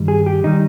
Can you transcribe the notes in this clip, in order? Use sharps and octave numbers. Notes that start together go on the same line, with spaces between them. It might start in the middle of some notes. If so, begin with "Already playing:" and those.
Already playing: G2 D#3 G3
G#4
G4
D#3 G3 D#4